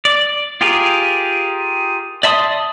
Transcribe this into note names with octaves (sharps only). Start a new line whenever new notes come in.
D5
F4 G4 G#4 A#4
D5 E5 A5 C6 D#6